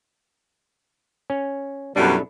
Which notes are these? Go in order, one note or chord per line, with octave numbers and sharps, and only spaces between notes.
C#4
F#2 B2 G3 D4 E4 A4